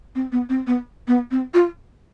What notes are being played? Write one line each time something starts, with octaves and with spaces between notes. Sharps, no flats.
C4
B3
C4
B3
B3
C4
F4